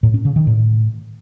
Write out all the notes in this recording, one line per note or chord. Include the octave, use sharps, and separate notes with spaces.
A2
C#4
C#3
D#3
A2